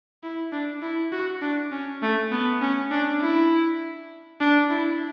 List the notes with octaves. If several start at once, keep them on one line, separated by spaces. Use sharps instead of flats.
E4
D4
E4
F#4
D4
C#4
A3
B3
C#4
D4
E4
D4
E4